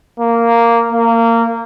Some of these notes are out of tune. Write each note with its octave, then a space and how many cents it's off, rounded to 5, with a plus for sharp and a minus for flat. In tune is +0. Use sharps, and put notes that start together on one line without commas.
A#3 -5
A#3 -20